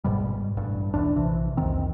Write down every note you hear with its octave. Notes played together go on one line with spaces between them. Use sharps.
G#1 G#2 B2 G3
A1 G2
D#1 B1 E2 D4
A#1 C3 E3
C2 F2 D#3 C4